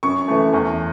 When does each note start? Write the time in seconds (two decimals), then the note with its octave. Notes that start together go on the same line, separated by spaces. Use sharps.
0.03 F#2 C#6
0.28 E3 A3
0.53 E2